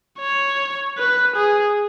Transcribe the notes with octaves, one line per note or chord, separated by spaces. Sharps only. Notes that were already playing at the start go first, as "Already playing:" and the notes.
C#5
B4
G#4